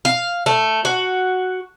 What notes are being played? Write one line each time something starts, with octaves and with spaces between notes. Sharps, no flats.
F5
A3
F#4